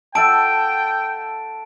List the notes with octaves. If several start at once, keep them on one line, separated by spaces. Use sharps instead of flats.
A4 E5 F#5 G5 A5 D7